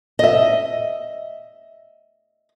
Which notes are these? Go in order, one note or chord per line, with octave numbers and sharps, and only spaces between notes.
D#5 E5